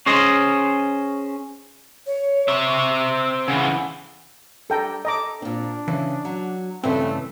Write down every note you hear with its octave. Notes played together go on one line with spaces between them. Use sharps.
C#4 G#4 C5 D#5
C#5
C4 E5 C#6
E6
C#3 E3 F#5
G3 D4 A4 G5 A#5
A4 D#5 A#5 D6
A#2 C4 D4
C#3 E3
F#3
G2 C#3 E3 A3 C4